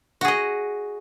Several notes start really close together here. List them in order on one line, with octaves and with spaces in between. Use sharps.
F#4 G#4 D#5